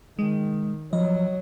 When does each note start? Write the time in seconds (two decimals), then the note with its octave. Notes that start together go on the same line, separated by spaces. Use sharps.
0.19 D#3 G#3
0.93 F3 F#3 D#5